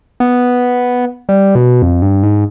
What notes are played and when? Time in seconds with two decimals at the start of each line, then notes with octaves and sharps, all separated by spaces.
0.20 B3
1.29 G3
1.55 B2
1.82 F2
2.02 G2
2.23 G#2